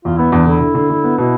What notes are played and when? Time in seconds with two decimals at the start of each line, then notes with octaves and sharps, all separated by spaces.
0.05 E2 F4
0.18 B3 E4
0.32 E2 D4
0.46 D3 E4
0.60 D3
0.75 D3
0.90 D3
1.04 B3
1.18 B2 E4